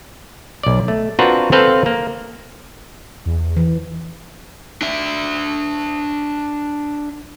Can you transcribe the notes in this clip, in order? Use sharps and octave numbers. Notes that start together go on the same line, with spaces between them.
B1 D5
A3
C4 D4 F4 F#4 A#4 B4
C4 A4 B4 C5 F5
A#3
E2
E3
D4 E5